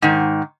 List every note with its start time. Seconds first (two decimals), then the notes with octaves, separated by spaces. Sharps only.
0.02 G#2 D#3